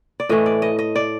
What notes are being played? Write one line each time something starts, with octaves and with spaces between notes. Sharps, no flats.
D5
A2 E3 A3 D#5
D5
D#5
D#5
D5